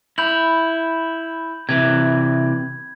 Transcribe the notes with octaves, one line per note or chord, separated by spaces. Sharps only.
E4 B5 G6 F#7
C3 E3 G#6